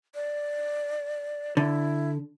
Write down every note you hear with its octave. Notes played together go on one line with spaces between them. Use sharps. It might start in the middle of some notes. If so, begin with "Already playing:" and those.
D5
D3 E4